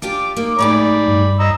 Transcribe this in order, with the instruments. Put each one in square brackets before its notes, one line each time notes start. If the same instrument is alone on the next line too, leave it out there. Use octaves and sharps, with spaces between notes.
[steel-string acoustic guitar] D4 F4 G4 [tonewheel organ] D6
[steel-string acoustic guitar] A#3 D#4
[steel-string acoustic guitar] A2 G#3 D#4 [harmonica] D5 B5
[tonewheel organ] G2
[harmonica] D#5 A#5 E6